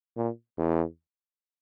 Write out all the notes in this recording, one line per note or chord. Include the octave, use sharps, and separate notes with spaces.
A#2
E2